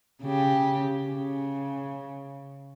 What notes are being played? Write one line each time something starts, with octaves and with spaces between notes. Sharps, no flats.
C#3 G4
C#3